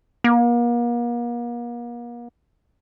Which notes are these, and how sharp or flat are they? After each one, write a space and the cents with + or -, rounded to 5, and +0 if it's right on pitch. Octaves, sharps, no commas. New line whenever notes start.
A#3 +40